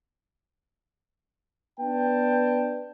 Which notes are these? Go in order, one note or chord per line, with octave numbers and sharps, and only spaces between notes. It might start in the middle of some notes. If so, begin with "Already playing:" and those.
B3 D4 G5 A5